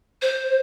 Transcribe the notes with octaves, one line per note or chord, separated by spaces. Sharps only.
C5